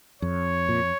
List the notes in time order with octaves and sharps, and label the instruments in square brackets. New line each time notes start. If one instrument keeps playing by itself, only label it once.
[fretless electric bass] F2 [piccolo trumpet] C#5
[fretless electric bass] A#2